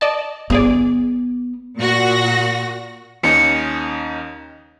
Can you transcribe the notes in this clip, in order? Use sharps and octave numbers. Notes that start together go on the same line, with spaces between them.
D5 D#5 A5
G1 B3 G#4 D5
A#2 F#4 A#6
D#2 C#4 D#4 C#7